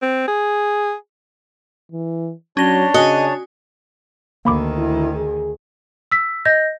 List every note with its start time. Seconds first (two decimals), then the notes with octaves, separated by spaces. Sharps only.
0.02 C4
0.28 G#4
1.92 E3
2.57 F#3 C#4 D4 C#5 A5 A#6 G7
2.94 C#3 F#4 D#5 G#5
4.45 D2 D#3 A#3 B5 D6
4.78 E4
5.16 G#4
6.12 E6 B6
6.45 D#5 G6 A#6